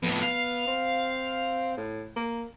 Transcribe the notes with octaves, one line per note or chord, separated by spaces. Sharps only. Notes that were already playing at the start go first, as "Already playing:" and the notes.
F2 A2 B3
F5
C4
A2
A#3